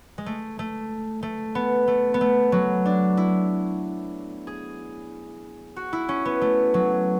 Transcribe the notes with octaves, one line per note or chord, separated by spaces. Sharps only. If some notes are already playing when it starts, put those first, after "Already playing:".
G#3
A3
A3
A3
B3
A3
B3
A3
F#3
D4
E4
G#4
F#4
E4
C#4
B3
A3
F#3